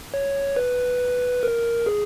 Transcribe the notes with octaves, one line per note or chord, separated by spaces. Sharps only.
C#5
B4
A#4
G#4